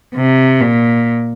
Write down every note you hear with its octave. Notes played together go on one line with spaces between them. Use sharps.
C3
A#2